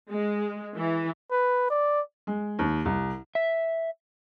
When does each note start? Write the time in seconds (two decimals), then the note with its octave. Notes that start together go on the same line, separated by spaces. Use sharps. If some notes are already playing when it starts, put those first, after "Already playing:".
0.11 G#3
0.75 E3
1.31 B4
1.70 D5
2.27 G#3
2.59 D#2
2.85 C2
3.35 E5